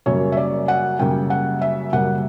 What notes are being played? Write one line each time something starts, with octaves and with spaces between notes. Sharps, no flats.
F#2 C#3 G3 A#3 C#5
E5
D5
F#5
F#2 C#3 G3 A#3 G5
F#5
E5
F#2 C#3 G3 A#3 F#5